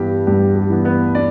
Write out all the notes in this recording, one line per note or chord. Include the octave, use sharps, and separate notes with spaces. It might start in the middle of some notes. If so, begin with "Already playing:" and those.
Already playing: G2 E3 B3 G4
G2 G4
G4
E3 B3
B3 B4
D4 D5